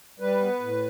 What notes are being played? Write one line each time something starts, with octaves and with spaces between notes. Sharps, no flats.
G3 B4
B3
A2